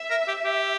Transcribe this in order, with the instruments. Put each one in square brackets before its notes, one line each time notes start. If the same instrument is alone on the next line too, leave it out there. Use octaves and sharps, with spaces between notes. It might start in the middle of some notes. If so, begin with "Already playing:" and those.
Already playing: [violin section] E5
[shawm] A#4
G4
G4